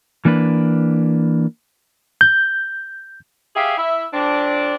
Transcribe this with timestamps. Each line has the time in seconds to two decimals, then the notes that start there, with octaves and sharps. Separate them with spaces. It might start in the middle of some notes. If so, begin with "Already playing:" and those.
0.25 E3 A#3 D4 B4
2.21 G6
3.56 G4 G#4 E5 F5
3.78 E4 E5
4.14 F2 C4 D4